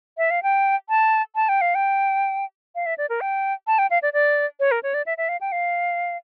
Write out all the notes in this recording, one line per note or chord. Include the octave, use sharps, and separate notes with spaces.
E5
F5
G5
A5
A5
G5
F5
G5
F5
E5
D5
A#4
G5
A5
G5
F5
D5
D5
C#5
A#4
C#5
D5
E5
E5
F5
G5
F5